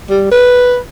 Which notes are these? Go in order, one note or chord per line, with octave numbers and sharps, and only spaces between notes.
G3
B4